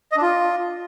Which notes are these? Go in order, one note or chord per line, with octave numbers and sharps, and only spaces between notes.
D#5
D4
F4